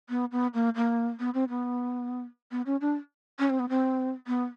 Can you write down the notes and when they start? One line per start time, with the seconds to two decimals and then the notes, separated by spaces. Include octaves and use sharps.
0.10 B3
0.32 B3
0.54 A#3
0.76 A#3
1.20 B3
1.34 C4
1.49 B3
2.51 B3
2.66 C#4
2.81 D4
3.39 C#4
3.50 C4
3.60 B3
3.69 C4
4.27 B3